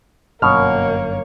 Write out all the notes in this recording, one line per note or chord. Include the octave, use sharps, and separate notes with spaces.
G1 F#2 B2 A#3 C#5 F6